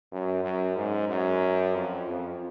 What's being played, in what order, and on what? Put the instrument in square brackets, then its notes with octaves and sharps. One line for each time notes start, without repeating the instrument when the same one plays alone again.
[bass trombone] F#2
F#2
G#2
F#2
F2
F2